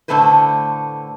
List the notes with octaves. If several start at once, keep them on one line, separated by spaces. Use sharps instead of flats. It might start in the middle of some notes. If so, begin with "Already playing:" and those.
A2 D3 A3 A4 B4 C5